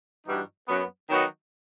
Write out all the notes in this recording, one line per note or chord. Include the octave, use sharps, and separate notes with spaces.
G2 E3 G3 D#4 F#4
F#2 F#3 B3
D#3 F#3 B3 D#4 F#4